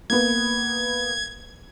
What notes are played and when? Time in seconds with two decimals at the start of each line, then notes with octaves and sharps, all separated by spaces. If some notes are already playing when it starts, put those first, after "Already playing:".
0.10 A#3 B3 G#6